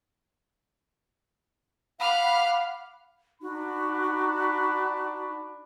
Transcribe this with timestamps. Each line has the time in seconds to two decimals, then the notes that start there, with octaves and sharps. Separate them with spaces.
1.99 F5 F#5 B5 D6 F6
3.42 D4 D#4 F#4 B5